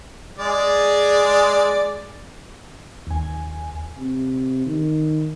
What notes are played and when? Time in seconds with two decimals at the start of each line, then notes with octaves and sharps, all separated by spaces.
0.39 G#3 G#4 D5
3.07 D#2 G#5
3.97 C3
4.66 D#3